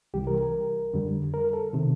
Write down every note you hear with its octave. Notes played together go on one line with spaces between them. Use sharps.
C2 C3 E3 G3 G4
A#4
A#4
F2 D3 G3
A#4
A4
C3 D#3